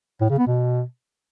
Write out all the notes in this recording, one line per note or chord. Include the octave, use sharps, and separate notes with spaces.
A2
C#3
B3
B2